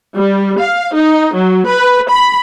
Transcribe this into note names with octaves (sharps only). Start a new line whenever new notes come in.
G3
F5
D#4
F#3
B4
B5